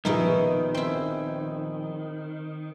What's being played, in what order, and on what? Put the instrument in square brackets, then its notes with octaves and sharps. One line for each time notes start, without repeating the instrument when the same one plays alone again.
[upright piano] A#1 G#4 [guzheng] B2 D#4 E4 [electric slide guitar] D#3
[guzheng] C4 E4